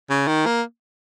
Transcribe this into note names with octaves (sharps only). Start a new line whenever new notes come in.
C#3
D#3
A#3